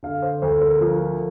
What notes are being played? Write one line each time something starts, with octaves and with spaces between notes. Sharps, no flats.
D3 F5
C5
D2 C5
A#4
F3